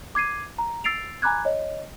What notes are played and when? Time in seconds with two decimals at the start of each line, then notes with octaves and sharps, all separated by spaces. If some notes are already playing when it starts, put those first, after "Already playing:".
0.15 D6 G#6 C7 D#7
0.58 A#5
0.84 E6 A6 C7 D7 F7
1.22 G#5 A#5 B5 D6 F#6 G#6
1.45 C#5 D#5